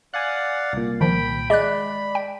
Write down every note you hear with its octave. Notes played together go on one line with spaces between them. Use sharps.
D5 F5 F#5 G#5 F#6
C2 A#2
D#3 F3 G5 B5
G#3 D5 D#5 B5 F#6
G5